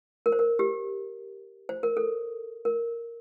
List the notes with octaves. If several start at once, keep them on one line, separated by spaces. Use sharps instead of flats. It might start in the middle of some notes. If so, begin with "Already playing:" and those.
A#4
C5
A#4
G4
C5
A#4
A4
A#4